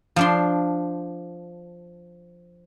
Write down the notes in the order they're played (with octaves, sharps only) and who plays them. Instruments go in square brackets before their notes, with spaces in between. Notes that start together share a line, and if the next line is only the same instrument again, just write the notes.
[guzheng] F3 D4 C6